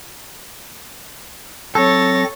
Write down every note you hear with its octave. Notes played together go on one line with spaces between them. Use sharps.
F#3 C4 A4 C#5 A6 A#6